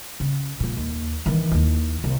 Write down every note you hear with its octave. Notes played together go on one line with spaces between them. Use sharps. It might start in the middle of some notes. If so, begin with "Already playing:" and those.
C#3
A#2 F3
D#2
D#3 E3
D#2 E4
C2